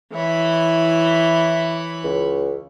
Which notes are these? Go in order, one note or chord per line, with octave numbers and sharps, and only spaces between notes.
E3 E4 C#5 B5
C#2